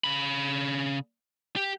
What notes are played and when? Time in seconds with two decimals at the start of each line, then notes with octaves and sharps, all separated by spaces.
0.04 C#3 B5
1.56 G4